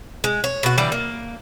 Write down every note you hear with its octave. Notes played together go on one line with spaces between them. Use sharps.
G#3
C#5
B2 F#4
D3 E3 G3 D5
A#3